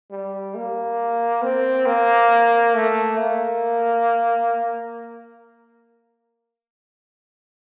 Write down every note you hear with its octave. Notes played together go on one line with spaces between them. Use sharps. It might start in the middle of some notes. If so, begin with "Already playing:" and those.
G3
A#3
C4
A#3
A3
A#3